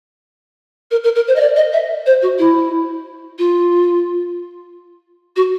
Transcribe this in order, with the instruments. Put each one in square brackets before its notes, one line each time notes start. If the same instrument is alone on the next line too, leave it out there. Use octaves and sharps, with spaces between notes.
[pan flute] A#4
A#4
A#4
C5
D#5
D5
D#5
E5
C5
F#4
E4
F4
F#4